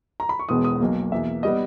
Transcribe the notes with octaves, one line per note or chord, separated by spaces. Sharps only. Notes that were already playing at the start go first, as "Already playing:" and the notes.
A#5
B5
C#6
E1 E2 B2 G#3 B3 D#6
D#6
B1 B2 A#3
E2 B2 A#3 E5
G3 B3 D#5